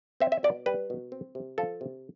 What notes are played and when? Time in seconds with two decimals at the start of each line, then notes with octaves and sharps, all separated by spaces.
0.20 C4 E5
0.32 E5
0.43 B2 D5
0.66 G3 B4
0.90 B2
1.12 C4
1.35 C3
1.58 F3 A4
1.81 C3